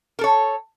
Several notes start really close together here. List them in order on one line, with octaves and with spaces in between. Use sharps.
A#4 A4 C#5